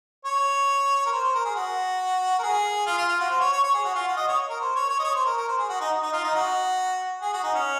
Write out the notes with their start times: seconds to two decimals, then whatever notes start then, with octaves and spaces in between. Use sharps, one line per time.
0.25 C#5
1.06 A#4
1.12 C5
1.24 C5
1.35 A#4
1.45 G#4
1.56 F#4
2.39 A#4
2.43 G#4
2.86 F4
2.98 F4
3.09 F4
3.20 F#4
3.30 C5
3.40 C#5
3.52 C#5
3.63 C#5
3.74 G#4
3.85 F#4
3.95 F4
4.07 F#4
4.17 D#5
4.28 C#5
4.50 A#4
4.61 C5
4.75 C#5
4.89 C#5
4.99 D#5
5.04 C#5
5.15 C5
5.25 A#4
5.37 A#4
5.48 C5
5.58 G#4
5.69 F#4
5.80 D#4
6.02 D#4
6.13 F4
6.24 D#4
6.35 F#4
7.22 G#4
7.33 F#4
7.43 D#4
7.54 C#4